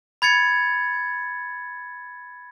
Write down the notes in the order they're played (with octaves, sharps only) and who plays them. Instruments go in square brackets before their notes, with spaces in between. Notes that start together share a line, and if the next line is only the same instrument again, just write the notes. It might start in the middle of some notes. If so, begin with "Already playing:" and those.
[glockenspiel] B5 G#6 A6 C#7